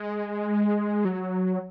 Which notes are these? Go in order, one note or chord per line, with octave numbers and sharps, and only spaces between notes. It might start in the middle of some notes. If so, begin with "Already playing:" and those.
Already playing: G#3
F#3